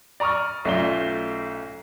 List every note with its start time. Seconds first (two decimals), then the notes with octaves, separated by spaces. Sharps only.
0.20 D5 A#5 C#6 D#6 F6
0.65 B1 A3 C#4 F4 D5 G7